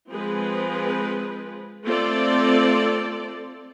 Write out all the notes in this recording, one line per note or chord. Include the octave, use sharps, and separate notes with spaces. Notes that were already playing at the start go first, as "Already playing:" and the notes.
F3 G#3 C4 G#4 B4
A3 C4 F4 A4 D5